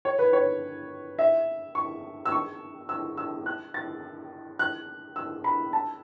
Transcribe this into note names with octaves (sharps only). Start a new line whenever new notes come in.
C#5
B4
C#5
E5
C#6
E6
C#6
E6
E6
F#6
A6
F#6
E6
B5
A5